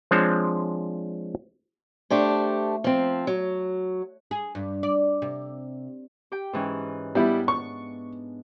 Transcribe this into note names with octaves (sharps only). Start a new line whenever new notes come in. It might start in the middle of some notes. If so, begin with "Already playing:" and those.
F3 G#3 C4 D4 C5 C#5
A3 D4 G4 C5
F3 C4
F#3
G#4
G2
D5
C3
G4 G5
G#2 E3 C#4
G3 B3 D4 E4
C#6